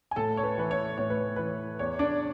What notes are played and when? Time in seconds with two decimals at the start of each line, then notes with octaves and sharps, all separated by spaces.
0.11 G#5
0.16 A2 A4 A5
0.37 C#5
0.43 B4
0.58 E3 B4
0.71 C#5
0.98 A2 C#5
1.10 B4
1.36 E3 B4
1.79 E2 C#5
1.99 D4 D5